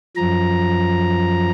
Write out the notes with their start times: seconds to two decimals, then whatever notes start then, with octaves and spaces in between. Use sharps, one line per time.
0.16 F#2 F3 A#5